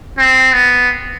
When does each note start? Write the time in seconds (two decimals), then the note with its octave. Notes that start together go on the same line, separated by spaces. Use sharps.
0.18 C4
0.53 B3